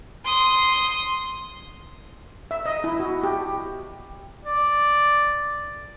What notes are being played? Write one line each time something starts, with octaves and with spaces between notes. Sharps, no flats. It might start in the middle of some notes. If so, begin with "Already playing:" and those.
C6 D#6
E5
D#5
E4
F#4
G4
D5